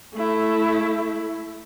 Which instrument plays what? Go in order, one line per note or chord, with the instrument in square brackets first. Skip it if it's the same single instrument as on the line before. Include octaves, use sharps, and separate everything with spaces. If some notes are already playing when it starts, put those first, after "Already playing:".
[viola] A3 E4